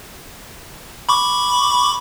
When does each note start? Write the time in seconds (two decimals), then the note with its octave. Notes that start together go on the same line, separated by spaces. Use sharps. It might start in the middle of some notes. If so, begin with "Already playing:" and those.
1.09 B5 C#6 D6